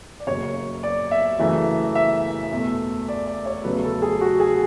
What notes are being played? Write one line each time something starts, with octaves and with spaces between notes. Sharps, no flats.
D5
F#1 F#2 C#3 C#5
D5
E5
F#2 C#3 E3 A3
E5
E2 B2 A3
D5
D5
C#5
E2 C#3 F#3 A3 B4
A4
G#4
F#4
G#4